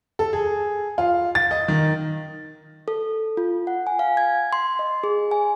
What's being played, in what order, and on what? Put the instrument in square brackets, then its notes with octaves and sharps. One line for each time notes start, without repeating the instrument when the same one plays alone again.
[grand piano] A4
G#4
F4
A6
D#5
D#3
[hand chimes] A4
F4
F#5
G#5
F5
G#6
C6
D#5
G#4
G#5